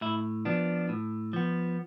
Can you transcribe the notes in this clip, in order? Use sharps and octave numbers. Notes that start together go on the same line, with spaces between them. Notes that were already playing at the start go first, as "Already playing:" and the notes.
A2 E4
F3 B3 D4
A2
F3 B3